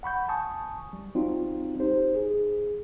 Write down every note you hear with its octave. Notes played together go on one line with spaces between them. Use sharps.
F#5 B5 C#6 G6
G#5 A5 C#6 D#6
G3
G3 C4 D#4 F4 F#4
D#4 G4 C5
G#4